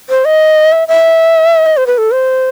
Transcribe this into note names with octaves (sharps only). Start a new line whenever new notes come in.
C5
D#5
E5
E5
D#5
C5
B4
A4
C5